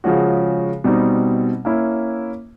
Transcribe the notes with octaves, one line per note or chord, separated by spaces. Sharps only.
C#3 F3 G#3 C#4 F#4
B2 G3 C4 D#4
A#3 C#4 E4